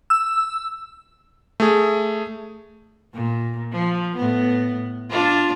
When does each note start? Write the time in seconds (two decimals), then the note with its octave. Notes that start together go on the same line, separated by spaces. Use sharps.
0.10 E6
1.60 A3 G#4
3.14 A#2
3.73 F3
4.17 A2 B3
5.10 D4 F4